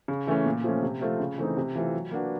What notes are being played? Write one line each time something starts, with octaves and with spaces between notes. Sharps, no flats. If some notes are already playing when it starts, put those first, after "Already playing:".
C#3
E3 A3 C#4
A#2
F3 A3 C#4
C3
F3 A3 C4 F4
C#3
E3 A3 C4 D#4
C3
E3 A3 C4 F4
F#3
A#3 D4 F#4 B4